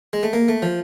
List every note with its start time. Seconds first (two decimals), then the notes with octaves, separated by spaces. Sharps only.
0.13 G#3
0.23 A3
0.33 A#3
0.48 A3
0.62 F3